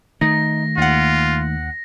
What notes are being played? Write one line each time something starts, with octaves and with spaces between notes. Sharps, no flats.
D#3 A3 D#4 A#6
D#2 F4 F#5